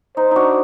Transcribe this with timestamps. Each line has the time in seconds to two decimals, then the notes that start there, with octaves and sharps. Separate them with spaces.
0.17 D#4 C5
0.31 D4 D#4 F#4